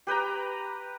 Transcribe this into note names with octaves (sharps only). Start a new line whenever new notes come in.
G4 B4 G5 A#5